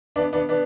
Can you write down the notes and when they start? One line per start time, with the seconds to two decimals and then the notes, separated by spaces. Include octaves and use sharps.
0.16 B3 D4
0.33 B3 D4
0.49 B3 D4